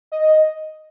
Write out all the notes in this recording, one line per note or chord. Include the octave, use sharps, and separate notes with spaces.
D#5